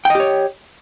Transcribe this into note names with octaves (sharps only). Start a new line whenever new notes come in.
G4 C#5 D#5 G5